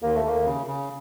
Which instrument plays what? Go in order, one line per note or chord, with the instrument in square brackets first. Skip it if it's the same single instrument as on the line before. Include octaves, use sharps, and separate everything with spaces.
[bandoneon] D#2 [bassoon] A#3
[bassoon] A3
[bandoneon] D#2 [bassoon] A#3
[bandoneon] C#3
C#3